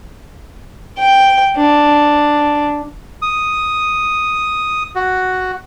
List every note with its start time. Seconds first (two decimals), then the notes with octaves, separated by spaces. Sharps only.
0.98 G5
1.56 D4
3.22 D#6
4.95 F#4